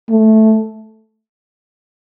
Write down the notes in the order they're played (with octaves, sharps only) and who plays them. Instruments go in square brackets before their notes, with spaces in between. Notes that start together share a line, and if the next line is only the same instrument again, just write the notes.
[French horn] A3